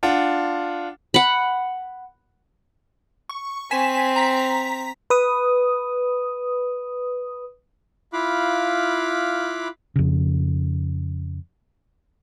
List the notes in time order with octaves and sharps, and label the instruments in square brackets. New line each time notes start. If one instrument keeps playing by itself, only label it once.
[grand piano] D4 F4 F#5
[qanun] F#5 B5
[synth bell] C#6
[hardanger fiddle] C4 [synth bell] G#5 B6 E7
[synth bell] A#5 B6
[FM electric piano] B4 D#6
[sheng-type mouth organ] E4 F4 F5 B5 D6 F#6
[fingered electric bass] F2 C#3